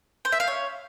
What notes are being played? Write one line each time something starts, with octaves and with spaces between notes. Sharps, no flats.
C5
E5
F5
C#5